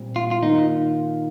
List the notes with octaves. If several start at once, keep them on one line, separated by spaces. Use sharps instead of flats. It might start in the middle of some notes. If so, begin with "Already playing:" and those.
Already playing: A#2 G3 C4
F4
F4
D#3 A#3 D#4 F4